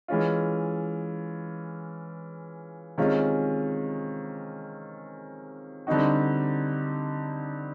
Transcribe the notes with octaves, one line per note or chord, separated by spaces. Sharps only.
E3 G#3 C#4 F4
C3 D#3 G#3 C#4 F4
D3 G3 C4 D#4 F#4